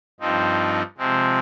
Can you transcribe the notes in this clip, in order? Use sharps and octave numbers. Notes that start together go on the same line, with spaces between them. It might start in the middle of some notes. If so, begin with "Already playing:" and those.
G2 F3 C4 D#4
C3 F3 G#3 C4